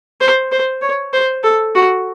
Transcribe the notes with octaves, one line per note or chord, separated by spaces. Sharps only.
C5
C5
C#5
C5
A4
F#4